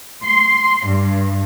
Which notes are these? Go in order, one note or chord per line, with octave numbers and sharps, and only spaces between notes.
C6
G2